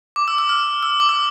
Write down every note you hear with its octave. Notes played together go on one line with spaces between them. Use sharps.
D6
E6
E6
F6
E6
D6
E6